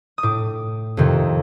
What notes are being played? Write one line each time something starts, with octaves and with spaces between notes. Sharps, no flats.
D#6
A2 D6
F2 C3 D#3